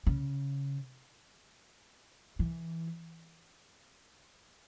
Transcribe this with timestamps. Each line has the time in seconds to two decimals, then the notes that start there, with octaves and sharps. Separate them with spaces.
0.07 C#3
2.39 E3